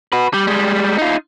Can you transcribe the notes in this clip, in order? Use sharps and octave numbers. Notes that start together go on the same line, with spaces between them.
F#4 B4
G3
G3 G#3
D#4 F4